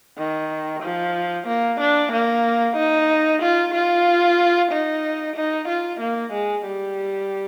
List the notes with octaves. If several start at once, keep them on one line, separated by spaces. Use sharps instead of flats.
D#3
F3
A#3
D4
A#3
D#4
F4
F4
D#4
D#4
F4
A#3
G#3
G3